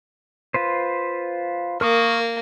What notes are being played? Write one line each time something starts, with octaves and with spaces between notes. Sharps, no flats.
F4 B4 C5
A#3 A#4 C#6 D#6